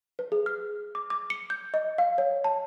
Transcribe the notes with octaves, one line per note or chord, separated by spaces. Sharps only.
B4
G#4
F6
D6
D6
C#7
G6
D#5
F5
C#5
A5